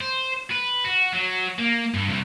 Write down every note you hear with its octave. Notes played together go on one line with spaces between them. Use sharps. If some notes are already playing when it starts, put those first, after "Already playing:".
C5
B4
F#4
F#3
A#3
G2
C2